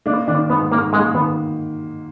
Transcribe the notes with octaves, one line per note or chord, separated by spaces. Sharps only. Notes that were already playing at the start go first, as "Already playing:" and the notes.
A#3 D4
D#3 D4
G#2 B3
G#2 A#3
G#3 A#3
D#3 B3